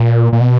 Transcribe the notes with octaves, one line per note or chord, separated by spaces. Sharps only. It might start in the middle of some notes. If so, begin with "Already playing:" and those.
Already playing: A#2
A#2
B2